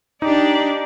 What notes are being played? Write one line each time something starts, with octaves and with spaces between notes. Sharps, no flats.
D4 D#4 G4 D5